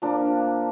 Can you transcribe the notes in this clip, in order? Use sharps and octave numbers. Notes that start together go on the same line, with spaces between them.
A#2 F3 A#3 D4